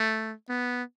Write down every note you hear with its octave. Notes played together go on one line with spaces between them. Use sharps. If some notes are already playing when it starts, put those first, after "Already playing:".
Already playing: A3
B3